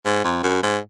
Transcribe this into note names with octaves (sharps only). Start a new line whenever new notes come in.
G#2
F2
F#2
G#2